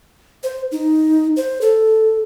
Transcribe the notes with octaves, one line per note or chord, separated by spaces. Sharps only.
C5
D#4
C5
A4